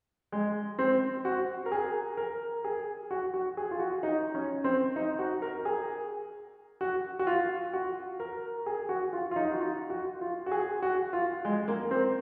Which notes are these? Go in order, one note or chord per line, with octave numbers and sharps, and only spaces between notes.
G#3
C4
F#4
A#4
G#4
A#4
G#4
F#4
F#4
G#4
F4
F#4
D#4
C#4
C4
D#4
F#4
A#4
G#4
F#4
F#4
F4
F#4
A#4
G#4
F#4
F4
F4
D#4
F#4
F4
F#4
F4
F#4
G#4
F#4
F4
G#3
A#3
C4